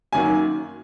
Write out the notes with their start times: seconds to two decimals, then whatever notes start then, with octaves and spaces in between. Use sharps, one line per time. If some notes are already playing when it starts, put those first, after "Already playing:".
0.12 F#2 D#3 F#3 A#3 G#5